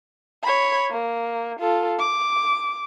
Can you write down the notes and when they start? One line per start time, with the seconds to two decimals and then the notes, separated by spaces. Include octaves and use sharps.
0.43 C#5 B5
0.91 A#3
1.60 F4 A4
1.99 D6